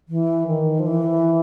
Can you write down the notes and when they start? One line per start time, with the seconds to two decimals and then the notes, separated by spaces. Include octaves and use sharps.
0.09 E3
0.48 D#3
0.79 F3
0.86 E3